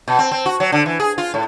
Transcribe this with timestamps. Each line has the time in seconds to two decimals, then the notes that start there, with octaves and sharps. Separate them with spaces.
0.08 B2
0.19 C4
0.31 C4
0.46 F#4
0.60 F#3
0.72 D3
0.86 E3
1.00 G#4
1.18 F4
1.34 A2